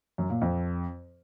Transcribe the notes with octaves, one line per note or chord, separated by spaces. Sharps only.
F#2
A#2
F2